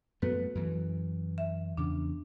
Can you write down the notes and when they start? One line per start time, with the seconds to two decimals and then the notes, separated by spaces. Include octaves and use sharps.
0.22 F#2 A3 B3 F#4 A4 B4
0.55 F#2 E3
1.38 E5
1.77 E2 C#3 D4